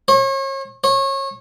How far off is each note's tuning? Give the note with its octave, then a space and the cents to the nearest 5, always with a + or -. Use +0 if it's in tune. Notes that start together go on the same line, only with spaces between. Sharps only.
C#5 -40
C#5 -30